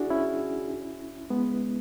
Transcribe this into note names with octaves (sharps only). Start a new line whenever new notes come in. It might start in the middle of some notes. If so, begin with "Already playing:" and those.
Already playing: D4 E4 F#4 G#4
C#4 E4
G#3 B3